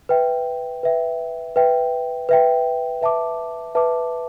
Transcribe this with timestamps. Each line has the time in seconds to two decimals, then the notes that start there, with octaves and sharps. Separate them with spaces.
0.09 B4 E5 G5
0.83 B4 E5 G5
1.56 B4 E5 G5
2.29 B4 E5 G5
3.01 B4 E5 A5 D6
3.75 B4 E5 A5 D6